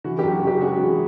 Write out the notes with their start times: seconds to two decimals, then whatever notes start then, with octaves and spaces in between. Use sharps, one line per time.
0.04 E3 F#4
0.19 G4
0.23 F#2
0.32 F#4
0.42 C#3
0.47 G4
0.61 G#3 F#4 G#4
0.79 E3